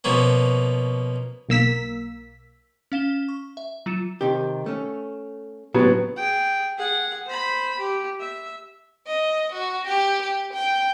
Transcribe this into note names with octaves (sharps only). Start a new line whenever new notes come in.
B2 F3 A#3 B3 C#4
B1 A#3 E6 B6
C#4 F5 E7 G7
C#6
E5
F#3 F4 C#7 E7
C3 D#3 G4
A3 C#4
A2 C3 F#3 B3 D4
G#4 G5
G#4 F#5
C5 B5
G4
E5
D#5
F#4
G4
G4
G5